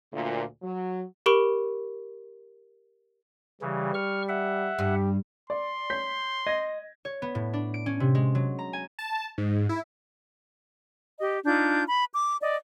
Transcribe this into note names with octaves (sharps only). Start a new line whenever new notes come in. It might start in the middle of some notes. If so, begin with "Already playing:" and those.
D2 A#2
F#3
G4 A#4 B5 C#6 D7
C#3 E3 G3
C#6 F6
E5 F#5
G2 G4
D5 C6
C#5 G6 B6
D#5 G#6 A#6
C#5
B3
A2
D4
D7
C#4
C3
G#3
F#3
A#5
G#5
A5
G#2
E4
G4 D#5
D4 D#4 F4 G6
B5
D6
D5 D#5